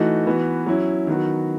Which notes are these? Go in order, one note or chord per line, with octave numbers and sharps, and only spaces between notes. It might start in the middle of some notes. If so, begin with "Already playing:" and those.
Already playing: E3 A3 D#4 F#4
E3 B3 F#4
F#3 C#4 E4
D#3 F#3 B3 F#4